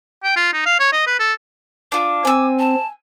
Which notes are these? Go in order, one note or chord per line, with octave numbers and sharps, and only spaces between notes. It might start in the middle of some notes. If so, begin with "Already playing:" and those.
G5
F4
D#4
F5
C#5
D#5
B4
A4
D4 F4 D6
C4 G#5 E6
A5